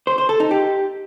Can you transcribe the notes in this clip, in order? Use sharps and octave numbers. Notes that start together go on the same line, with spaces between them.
C5
C5
A4
D#4
G4